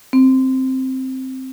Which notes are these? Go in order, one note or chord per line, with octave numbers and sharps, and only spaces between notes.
C4